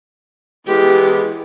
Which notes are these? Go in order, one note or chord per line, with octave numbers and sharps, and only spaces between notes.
E3 G#3 B3 G4